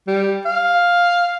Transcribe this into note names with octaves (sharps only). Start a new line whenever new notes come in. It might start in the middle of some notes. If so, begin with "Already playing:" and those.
G3
F5